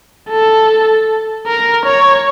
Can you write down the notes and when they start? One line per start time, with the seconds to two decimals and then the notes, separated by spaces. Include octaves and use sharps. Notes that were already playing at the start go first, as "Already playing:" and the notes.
0.30 A4
1.47 A#4
1.86 C#5